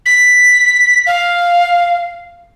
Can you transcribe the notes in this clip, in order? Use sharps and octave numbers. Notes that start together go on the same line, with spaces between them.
B6
F5